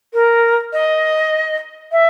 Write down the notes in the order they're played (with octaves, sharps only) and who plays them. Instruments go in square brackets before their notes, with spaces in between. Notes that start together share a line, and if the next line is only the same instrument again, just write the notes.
[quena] A#4
D#5
E5